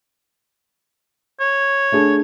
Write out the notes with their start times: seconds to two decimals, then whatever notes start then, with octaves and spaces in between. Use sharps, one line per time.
1.40 C#5
1.92 A3 D4 G#4